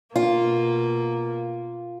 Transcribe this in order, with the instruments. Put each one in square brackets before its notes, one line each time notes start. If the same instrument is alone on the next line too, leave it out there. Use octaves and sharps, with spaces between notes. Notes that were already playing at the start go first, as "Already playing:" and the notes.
[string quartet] B2 A#3 [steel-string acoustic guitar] F4